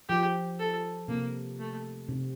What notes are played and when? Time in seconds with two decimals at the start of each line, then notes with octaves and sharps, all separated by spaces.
0.09 F3 G4
0.59 A4
1.08 C3 A#3
1.59 A3
2.09 C3